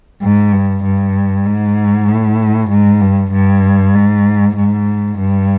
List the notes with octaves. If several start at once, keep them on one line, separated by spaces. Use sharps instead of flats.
G#2
G2
G2
G#2
A2
G#2
G2
G2
G#2
G#2
G2